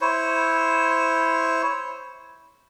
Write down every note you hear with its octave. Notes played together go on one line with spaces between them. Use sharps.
E4 C5 C#5